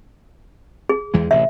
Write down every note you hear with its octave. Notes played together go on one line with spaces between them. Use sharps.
G#4
E2 E3 G#3
A1 C3 E5